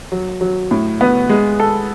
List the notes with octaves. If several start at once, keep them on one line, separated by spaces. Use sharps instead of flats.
F#3
F#3
A2
B3
G#3
A4